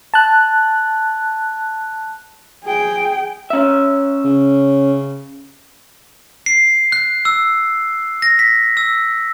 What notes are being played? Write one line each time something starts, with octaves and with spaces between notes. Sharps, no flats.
A5 F#6
G#4 G5
C#4 E5
C#3
C7
F#6
E6
A#6
B6
E6